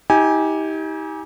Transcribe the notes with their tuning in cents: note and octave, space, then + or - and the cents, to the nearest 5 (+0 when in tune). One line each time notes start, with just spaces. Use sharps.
D#4 +40 G4 -5 G#5 +0